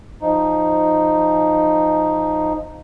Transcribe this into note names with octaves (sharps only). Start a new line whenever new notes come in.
F3 D#4